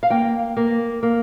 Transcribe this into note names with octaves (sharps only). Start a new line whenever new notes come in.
F5
A#3 G5
A#3
A#3